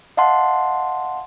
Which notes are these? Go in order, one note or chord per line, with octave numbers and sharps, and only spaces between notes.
D#5 F5 F#5 A5 C6